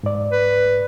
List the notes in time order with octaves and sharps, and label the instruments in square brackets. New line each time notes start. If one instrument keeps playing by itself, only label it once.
[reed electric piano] G#2 D5
[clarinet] B4